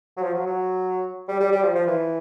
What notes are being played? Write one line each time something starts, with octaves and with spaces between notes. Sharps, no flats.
F#3
F3
F#3
F#3
G3
G3
G3
F3
F3
E3